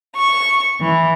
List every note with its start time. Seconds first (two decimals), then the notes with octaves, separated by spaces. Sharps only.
0.17 C#6
0.79 E3